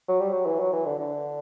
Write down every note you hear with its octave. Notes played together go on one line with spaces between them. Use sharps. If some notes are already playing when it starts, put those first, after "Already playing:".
F#3
G3
F#3
E3
F#3
E3
D3
D3